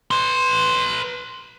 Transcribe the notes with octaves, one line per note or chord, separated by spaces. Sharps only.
B4 C6